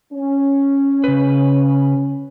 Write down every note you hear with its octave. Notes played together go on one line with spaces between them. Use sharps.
C#4
C#3 B4